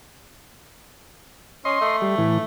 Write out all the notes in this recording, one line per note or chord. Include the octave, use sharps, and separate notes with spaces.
C#4 D#5 C6
A3
G3
A2 E3